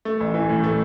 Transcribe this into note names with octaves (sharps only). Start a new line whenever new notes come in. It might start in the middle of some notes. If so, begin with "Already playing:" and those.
A3
A1
E3
A2
A3